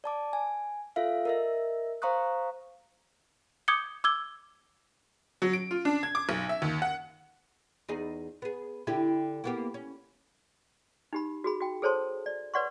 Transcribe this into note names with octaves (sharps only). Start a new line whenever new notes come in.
D5 A5 D6
G#5
F4 A4 E5 F5
A#4 D#5 E5
C5 F5 A#5 C#6 D#6 F#6
D6 D#6 G6 G#6 C#7 G7
D6 E6 G#6 G7
F#3
D7
F4
D4
G#6
D6
B1
E5
D#2
F#5
E2 D#4 G#4
B3 G#4
D3 E4 G4
A#3 B3 G4
C#4
D#4 G4 B5
F#4 G#4 B5
F#4 G5
G#4 A4 C5 C#5 A5 C6
D5
B4 C#5 D5 F#5 C6 C#6